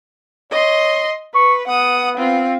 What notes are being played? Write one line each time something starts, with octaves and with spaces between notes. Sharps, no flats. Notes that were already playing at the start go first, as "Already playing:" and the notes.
C#5 D#5 C6
B4 C#6
B3 F#5 D#6
C4 F4